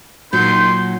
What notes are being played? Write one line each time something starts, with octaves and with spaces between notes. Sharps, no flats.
A#2 D#3 F#3 C6 G6